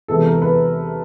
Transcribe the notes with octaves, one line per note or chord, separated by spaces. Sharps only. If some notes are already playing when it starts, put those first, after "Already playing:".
E2 C3 E3 G#3 B3 A4
A#4
B4